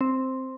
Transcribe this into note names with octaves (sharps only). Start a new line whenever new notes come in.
C4